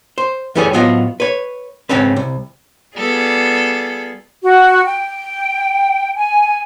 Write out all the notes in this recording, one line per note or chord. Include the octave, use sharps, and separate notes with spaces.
C5
F#2 E3 G3 A3 G#4 C#5
A2 F#3 B3 F4 C5 D#5
B4 C#5
G#2 C#3 C4 C#4 B4
C2
G3 B3 F4 G#4 A4 D5
F#4
G5
G#5